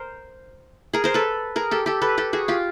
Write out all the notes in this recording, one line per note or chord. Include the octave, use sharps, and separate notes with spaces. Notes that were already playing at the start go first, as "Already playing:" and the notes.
Already playing: A#4 C5
G#4 A#4
A#4 C5
A4 B4
G#4 A#4
G4 A4
G4 A4
A4 B4
G4 A4
F#4 G#4
F4 G4